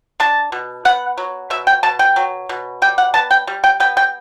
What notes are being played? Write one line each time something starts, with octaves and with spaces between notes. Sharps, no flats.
D4 A5
B2
B3 F#5
F#3
B2 E5
G5
B2 A5
G5
F#3
B2
G3 G5
F#5
B3 A5
G5
G3
G5
B3 G5
G5